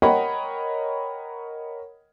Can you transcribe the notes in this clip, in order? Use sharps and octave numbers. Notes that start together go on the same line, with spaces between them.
A#4 C#5 D#5 F#5 G5 B5